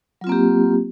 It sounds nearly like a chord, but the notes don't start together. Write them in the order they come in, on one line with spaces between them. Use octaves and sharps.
F#3 F4 C4 A#3 G4